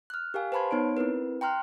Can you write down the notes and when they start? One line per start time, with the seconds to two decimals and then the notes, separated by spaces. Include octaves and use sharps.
0.10 F6 F#6
0.34 G4 A#4 F5 G#5
0.52 B4 C5 A5 B5 C6 G#6
0.71 B3 D#4 C#5 D7
0.97 C4 E4 A#4 B4
1.41 G5 A#5 C6 F6 F#6